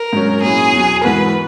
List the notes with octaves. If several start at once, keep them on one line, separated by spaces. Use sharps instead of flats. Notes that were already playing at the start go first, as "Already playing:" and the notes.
Already playing: A#4
G#2 F#3 C#4
A#2 F#3 C#4 E4 G#4
E2 B2 F#3
G#2 E3 B3 F#4 A#4 B4